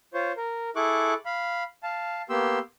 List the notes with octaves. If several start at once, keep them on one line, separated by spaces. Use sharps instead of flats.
F4 C5 C#5
A#4
E4 G#4 A4 C#6 D6 F#6
F5 B5
F5 A5
A#3 B3 G4 C6 E6